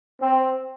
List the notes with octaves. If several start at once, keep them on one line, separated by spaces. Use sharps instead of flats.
C4